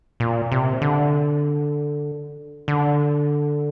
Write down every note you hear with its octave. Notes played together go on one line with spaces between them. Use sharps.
A#2
C3
D3
D3